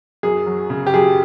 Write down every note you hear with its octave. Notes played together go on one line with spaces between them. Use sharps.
F#2 G#4
F#3
C#3
G4
F#2 G#4